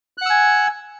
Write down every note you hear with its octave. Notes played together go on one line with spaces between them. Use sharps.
F#5 G#5 E6 F#6